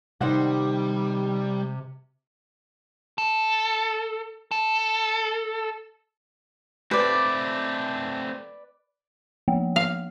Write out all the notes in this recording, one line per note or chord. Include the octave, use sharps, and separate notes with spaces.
C3 D#3 G3 C5 F#5
A4
A4
A3 C4 B4 D5
F3 A#3 B3
F5